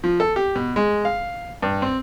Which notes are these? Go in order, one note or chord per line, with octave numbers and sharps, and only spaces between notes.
F3
A4
G4
B2
G#3
F5
G2
C4